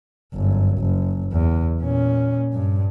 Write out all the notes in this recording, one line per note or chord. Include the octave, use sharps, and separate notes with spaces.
G1 F#2
F#1
E2
A#2 C#4
G2